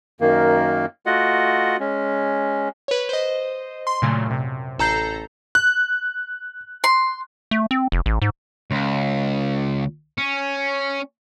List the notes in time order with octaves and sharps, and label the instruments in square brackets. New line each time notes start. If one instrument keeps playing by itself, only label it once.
[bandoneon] F#2 D#3 A#3
A3 F4 F#4 D#5 F#5
G#3 C#4
[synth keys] B4 C#5
C5 D#5
C6
A#2 C#3 F#3 A3
F#2 C3
A1 A4 A#5 G6 C7
[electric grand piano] F#6
[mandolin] C6
[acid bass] A3
C4
F1
A1
G#2
[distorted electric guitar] C#2
C#4